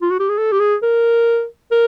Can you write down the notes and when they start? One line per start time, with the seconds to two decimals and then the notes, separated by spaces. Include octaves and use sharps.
0.01 F4
0.11 F#4
0.19 G4
0.29 G#4
0.38 A4
0.52 G4
0.60 G#4
0.82 A#4
1.71 A#4